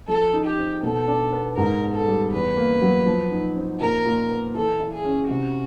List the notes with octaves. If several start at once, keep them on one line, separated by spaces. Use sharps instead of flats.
F3 A4
D#4
G4
C4
B2 A4
D4
B3
G#2 A#4
B3
A4
G3
E2 B4
A#3
F#3
F3
D#4
C4
A#2 A#4
A#2
B3
E3 A4
E4
G#4
C#4
C3 F#4